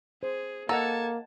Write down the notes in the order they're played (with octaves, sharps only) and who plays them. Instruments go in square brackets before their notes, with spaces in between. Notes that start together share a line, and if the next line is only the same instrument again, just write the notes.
[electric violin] G#4 [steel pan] C5
[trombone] A#3 [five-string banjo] A4 [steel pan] D#5 F#5 A#5 [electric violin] A5 G#6